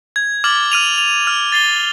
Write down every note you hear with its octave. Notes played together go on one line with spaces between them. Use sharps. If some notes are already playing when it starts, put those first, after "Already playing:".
G#6
D6 F6 G#6 A6 F#7
F6 D#7 F7
F7
F6
A6 C7 G7